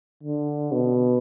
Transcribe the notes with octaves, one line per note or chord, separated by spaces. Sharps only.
D3
B2